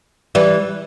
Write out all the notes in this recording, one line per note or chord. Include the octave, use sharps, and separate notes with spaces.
E3 G3